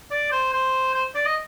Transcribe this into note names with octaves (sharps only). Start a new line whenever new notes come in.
D5
C5
C5
C5
D5
D#5